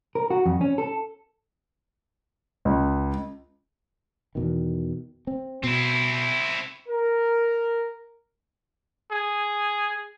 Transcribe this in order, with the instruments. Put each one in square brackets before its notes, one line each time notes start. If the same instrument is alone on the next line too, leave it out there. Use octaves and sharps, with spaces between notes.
[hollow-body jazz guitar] A#4
F#4
F2
C#4
A4
[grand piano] C#2
[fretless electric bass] E2 B2 D#3
C4
[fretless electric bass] B2 [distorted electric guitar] C4 E4
[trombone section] A#4
[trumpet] G#4